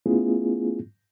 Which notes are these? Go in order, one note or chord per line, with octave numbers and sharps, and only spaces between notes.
A3 B3 C#4 E4 F4 G#4